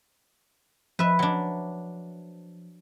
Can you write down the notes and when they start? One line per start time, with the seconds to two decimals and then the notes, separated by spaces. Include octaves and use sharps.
0.99 F3 B4 E5
1.19 F#3 D4